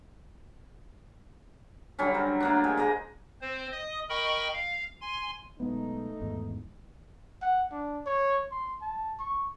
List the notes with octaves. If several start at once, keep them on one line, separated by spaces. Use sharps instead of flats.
D3 F#3 G3 C#4
A#4 C5
A3 A#3 D4
G#3 G4
A#3 G#4 D#5 A#5
C4 C5
D#5 D#6
A#4 D#5 G5 B5 C#6
F5
G#5 C6
B1 G#3 A3 B3 D#4
G#1 E2 G#2
F#5
D4
C#5
C6
A5
C#6